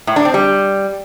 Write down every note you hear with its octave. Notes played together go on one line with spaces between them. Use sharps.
A2
D4
C4
G3